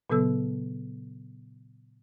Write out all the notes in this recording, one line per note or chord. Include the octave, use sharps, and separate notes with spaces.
A#2 C#3 F#3 B3 A4 E6